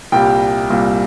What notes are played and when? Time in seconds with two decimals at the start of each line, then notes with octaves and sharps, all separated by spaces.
0.12 C2 A#2 G3 G5
0.70 C2 A#2 G3